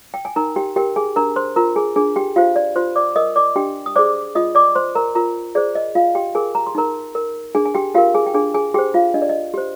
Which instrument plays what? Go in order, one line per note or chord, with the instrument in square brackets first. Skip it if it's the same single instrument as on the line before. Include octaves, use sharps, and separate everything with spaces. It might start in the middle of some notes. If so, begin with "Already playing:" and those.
[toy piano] G5
G#5
D#4 A#4 A#5
G4 G5
G4 A#4 G5
G#4 G#5
D4 A#4 A#5
C5 C6
F4 A#4 A#5
G#4 G#5
D4 G#4 G#5
G4 G5
F4 G4 C5 F5
D5
F4 C5 C6
D5 D6
A#4 D#5 D#6
D5 D6
D4 G4 G5
D#6
G#4 C5 D5 D6
F4 D#5 D#6
D5 D6
C5 C6
A#4 A#5
F4 A#4 A#5
G#4 C5 D5
D#5
F4 F5
G4 G5
G#4 A#4 G#5
A#5
C6
D#4 A#4 A#5
A#4
D4 G#4 G#5
G#5
G4 G5
F4 G4 A#4 F5
G#4 G#5
G5
D4 G#4 G#5
G#4 G#5
G4 G#4 C5 G5
F4 F5
D4 D#5
D5
D#5
G4 C5